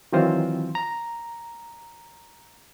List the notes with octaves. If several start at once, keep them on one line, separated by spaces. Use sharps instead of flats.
D#3 E3 F#3 C4 F4 C5
A#5